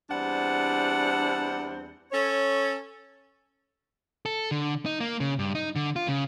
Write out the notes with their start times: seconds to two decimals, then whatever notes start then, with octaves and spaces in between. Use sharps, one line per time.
0.10 E2 G3 C4 D4 F#5
2.11 C#4 A4 C#5
4.26 A4
4.51 D3
4.86 D#4
5.00 A#3
5.20 C#3
5.39 G2
5.55 D#4
5.76 D3
5.96 F4
6.08 C#3